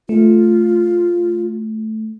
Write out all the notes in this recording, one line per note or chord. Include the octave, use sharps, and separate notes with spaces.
A3 F4